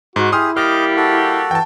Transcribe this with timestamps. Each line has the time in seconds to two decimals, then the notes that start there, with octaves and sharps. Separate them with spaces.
0.16 G#2 F#4
0.32 E4 G4 G#4 C6 D#6 F6
0.57 G3 A#3 G4 D#5 D6 F6
0.97 F#4 A4
1.51 E3 G5 A5